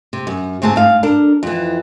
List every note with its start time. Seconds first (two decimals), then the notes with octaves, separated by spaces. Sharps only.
0.13 C3
0.27 F#2
0.62 D2 G#2 C4 G#4 A5
0.76 G#2 F5
1.03 D4 A4 A#4
1.43 F2 E3